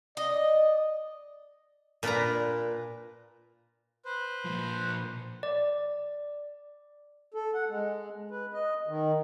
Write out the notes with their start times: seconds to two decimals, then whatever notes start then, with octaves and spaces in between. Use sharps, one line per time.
0.17 D5 D#5
2.03 A#2 D4 A#4 B4 A#5
4.05 B4 C5
4.46 A#2 F3
5.43 D5
7.34 A4
7.55 F#5
7.69 G#3
8.31 B4
8.54 D#5
8.87 D#3